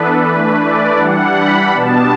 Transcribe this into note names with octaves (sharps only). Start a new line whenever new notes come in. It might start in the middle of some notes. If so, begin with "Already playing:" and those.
Already playing: E3 B3 D4 A4 B4
E3 A3 D4 B4
D5
E3 G3 D4 F#5
B5
B2 G3 B3 D4 A5